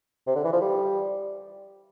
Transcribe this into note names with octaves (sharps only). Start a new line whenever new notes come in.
C3
D3
E3
F3
G3